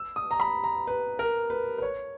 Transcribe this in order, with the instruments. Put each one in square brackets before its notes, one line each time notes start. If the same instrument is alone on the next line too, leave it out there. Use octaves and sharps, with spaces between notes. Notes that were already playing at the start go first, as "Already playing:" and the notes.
Already playing: [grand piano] E6
D#6
A#5
B5
A#5
B4
A#4
B4
B4
C#5